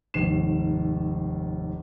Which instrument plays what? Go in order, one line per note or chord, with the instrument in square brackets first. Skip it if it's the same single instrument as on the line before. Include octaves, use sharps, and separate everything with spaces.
[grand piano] F1 D#2 G#2 C7 E7